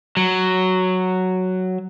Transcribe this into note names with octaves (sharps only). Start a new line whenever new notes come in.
F#3